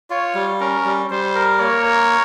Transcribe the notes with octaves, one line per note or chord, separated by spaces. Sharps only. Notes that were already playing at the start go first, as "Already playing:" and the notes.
F4 C#5
G3
C#4 A#4
G3
G3 C5
A#4
A#3 C#5
A#4